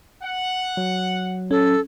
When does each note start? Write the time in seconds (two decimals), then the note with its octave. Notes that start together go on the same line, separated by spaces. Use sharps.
0.22 F#5
0.77 F#3
1.51 C#4 A4